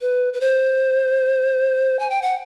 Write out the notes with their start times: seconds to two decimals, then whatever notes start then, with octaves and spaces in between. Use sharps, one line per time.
0.01 B4
0.33 B4
0.41 C5
1.99 G#5
2.10 G5
2.22 F#5